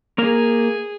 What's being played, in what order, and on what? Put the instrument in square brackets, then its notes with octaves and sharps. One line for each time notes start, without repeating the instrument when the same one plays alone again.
[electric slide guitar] A#3 A#4 [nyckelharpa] G#4